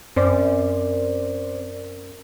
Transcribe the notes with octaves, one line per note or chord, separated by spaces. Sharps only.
F#2 C4 C5 D5